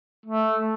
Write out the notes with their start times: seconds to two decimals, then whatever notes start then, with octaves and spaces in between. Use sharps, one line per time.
0.26 A3